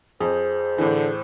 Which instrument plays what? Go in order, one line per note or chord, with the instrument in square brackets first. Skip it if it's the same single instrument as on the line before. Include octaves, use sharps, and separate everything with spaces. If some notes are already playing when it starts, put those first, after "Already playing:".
[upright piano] F2 [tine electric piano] G#4 [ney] C5
[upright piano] A2 E3 [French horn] D3